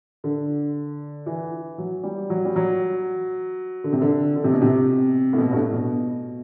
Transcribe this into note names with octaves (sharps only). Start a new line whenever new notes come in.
D3
E3
F#3
G3
F#3
G3
F#3
D3
C3
D3
D3
C3
B2
C3
A2
B2
G2
A2
B2